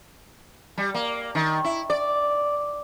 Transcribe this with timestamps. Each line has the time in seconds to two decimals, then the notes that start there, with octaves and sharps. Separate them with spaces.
0.78 G3
0.95 A#3
1.35 D#3
1.65 E4
1.90 D5